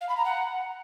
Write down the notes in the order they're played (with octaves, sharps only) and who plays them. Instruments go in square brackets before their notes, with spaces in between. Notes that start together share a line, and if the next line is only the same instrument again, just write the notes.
[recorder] F5
B5
A#5
F#5